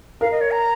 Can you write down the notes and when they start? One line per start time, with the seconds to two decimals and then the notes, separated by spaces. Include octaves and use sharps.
0.21 A#4 F5
0.31 D#5
0.41 C#5
0.51 A#5